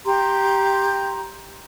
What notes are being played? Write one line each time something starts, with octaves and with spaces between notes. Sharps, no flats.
G4 A#5 C6